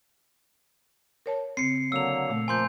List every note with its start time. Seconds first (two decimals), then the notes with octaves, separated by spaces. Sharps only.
1.26 A#4 C#5 A5
1.57 C#3 C4 C7 C#7
1.92 D3 F#3 A#3 E6 F7
2.29 A#2 A3
2.48 F3 A#3 G#5 C6 G6